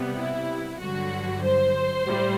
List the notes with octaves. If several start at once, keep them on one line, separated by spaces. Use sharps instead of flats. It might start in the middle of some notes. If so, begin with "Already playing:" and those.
Already playing: C3 G3 B3
E4
G2 D3 F#3 F#4
C5
A2 G3